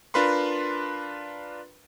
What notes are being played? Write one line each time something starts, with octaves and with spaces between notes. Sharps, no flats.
D4 F4 A#4 B4 B5 C6